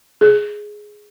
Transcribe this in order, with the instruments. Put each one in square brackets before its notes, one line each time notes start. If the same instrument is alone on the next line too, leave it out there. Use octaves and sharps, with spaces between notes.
[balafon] G#4